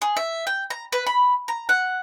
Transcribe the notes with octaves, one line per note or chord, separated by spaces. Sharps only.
G#4
E5
G5
A#5
B4
B5
A#5
F#5